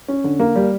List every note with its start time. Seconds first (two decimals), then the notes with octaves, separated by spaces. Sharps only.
0.08 C#4
0.24 D3
0.40 A#3
0.56 G3